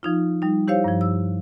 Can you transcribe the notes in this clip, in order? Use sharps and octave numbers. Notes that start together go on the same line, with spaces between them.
F3 D#4 F4
G3 D#4
E4 G4 C5 C#5 F5
G2 F3
E6